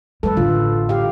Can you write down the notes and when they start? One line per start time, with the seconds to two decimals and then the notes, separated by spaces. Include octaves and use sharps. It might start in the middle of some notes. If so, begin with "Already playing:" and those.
0.23 G3 A3 A4 B4
0.37 A1 D3 F4
0.89 G4 F5